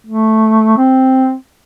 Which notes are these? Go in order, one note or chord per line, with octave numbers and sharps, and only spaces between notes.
A3
C4